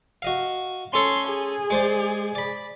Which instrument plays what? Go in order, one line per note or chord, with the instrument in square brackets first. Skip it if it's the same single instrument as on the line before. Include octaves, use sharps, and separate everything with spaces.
[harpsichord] F#4 D#5 F5
[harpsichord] C#4 A4 C#5 [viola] C6
[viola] G#4
[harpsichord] G#3 C5 D5
D5 B5